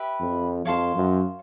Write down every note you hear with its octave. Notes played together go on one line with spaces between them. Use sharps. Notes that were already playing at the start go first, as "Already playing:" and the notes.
Already playing: G4 B4 E5
F2
F2 C#5 F5 A5 C6
F#2